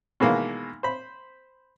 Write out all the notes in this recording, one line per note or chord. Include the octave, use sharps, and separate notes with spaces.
B2 D#3 E3 G#3 A#3
C5 B5